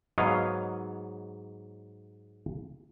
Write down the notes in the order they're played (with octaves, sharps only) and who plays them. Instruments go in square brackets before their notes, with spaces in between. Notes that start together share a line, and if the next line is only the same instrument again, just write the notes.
[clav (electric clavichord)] G#2 F#3 B3 C#5 D#5 F5